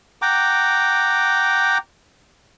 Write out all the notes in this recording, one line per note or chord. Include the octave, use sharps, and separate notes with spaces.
F#5 G5 A#5 D6